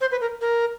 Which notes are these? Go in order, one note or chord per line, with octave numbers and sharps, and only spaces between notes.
C5
B4
A#4
A#4